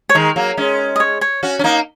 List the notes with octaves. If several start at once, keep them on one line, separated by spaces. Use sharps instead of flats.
C#5
D#3 G#3 A#4
F#3 A#3
G#3 C#4
D#5
C#5
C#5
C#4 F#4
C#4
A#3 D#4